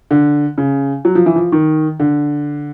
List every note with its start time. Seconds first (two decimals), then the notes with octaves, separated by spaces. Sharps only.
0.11 D3
0.58 C#3
1.05 F#3
1.15 F3
1.26 E3
1.36 F3
1.52 D#3
2.00 D3